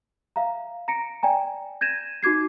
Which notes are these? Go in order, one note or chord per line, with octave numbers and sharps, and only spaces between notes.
E5 F5 A#5
A#5 A#6 C#7 D7
D5 G5 G#5 A#5
G6 G#6 A#6 D#7 E7
D#4 F#4 D6 G#6 C7